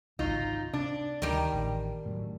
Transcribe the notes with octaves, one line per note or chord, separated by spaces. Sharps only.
G#1 C#2 F#3 D#4 F4
C3 D4
D2 D#3 G3
A1
F#2 A2